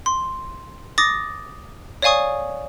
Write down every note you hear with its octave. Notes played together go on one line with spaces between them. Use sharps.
C6
D6 D#6 A6 A#6
C#5 D5 F5 G#5 C#6 D#6